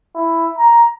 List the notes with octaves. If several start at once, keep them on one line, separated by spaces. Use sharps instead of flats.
E4
A#5